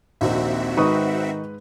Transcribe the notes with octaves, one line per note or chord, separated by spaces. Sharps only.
A#1 D#2 C4 D#4 F#4 E5
G#2 D#3 D#4 B4 C#6 D#6